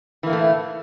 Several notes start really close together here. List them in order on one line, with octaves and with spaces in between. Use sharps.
E3 A#3 A2 A3